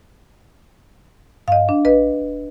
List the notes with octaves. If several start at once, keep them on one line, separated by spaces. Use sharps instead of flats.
G2 D#5 F5
D4
A1 B4 D#5
D#1